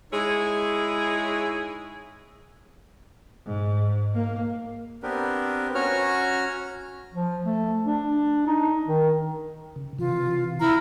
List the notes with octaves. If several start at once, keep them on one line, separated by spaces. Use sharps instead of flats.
G#3 D#4 E4 G#4 C#5
G#2
A#3
B3 C4 D4 G4 A#4 B4
C#4 F#4 C#5 A#5 F6
F3
A3
D4
D#4
D#3
C#3
C3 E3 F4
E4 A#5 F6